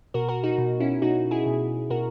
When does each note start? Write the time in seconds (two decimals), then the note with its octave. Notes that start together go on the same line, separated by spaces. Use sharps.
0.14 B2 F#4 A#4
0.29 F#4 A#4
0.43 D#4 F#4
0.58 B2
0.80 C#4 E4
1.02 B2 D#4 F#4
1.31 E4 G#4
1.46 B2
1.90 B2 F#4 A#4